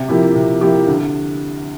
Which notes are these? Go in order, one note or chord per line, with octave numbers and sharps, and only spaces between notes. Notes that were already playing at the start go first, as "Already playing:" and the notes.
Already playing: C3
F3 A#3 E4 G4
C3
F3 A#3 E4 G4
D2